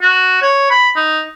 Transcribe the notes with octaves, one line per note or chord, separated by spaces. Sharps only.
F#4
C#5
B5
D#4